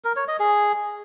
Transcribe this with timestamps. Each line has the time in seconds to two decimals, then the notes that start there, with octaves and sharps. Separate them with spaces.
0.05 A#4
0.16 C#5
0.28 D#5
0.40 G#4